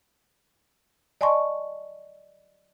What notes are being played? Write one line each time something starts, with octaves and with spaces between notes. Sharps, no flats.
D5 D#5 G#5 A5 C6 C#6